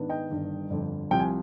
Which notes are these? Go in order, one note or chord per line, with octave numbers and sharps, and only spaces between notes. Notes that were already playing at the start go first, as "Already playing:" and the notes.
Already playing: G#2 D#3 B3 D4
D#5 G5
G1 G2 D#3
G1 F2 D3
C2 C3 F3 G5
G#5